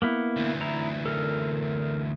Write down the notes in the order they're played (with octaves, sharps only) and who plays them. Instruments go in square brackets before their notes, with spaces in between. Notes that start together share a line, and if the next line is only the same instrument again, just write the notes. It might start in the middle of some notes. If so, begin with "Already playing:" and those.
[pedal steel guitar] A#3 B3 E4
[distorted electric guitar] D2 E3
[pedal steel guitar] E4 A#5
A4 A#4